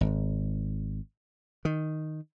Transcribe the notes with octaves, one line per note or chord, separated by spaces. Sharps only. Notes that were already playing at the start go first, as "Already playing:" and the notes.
G#1
D#3